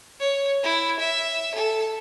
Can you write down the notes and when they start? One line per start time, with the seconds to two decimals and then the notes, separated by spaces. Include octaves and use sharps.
0.20 C#5
0.64 E4
1.00 E5
1.55 A4